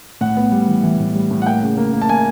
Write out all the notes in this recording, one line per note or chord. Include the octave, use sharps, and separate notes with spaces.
A2 F#5
B3
G3
E3
E3
A2
G3
A2
F#5
A#3 G5
C#3
A#3
A#3
A5
A#3 G#5